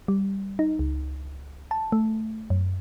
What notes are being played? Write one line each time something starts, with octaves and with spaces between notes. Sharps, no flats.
G3
D#4
C#2
A5
A3
F#2